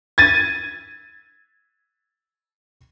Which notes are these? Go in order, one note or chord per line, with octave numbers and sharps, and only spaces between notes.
G#6 A6 D#7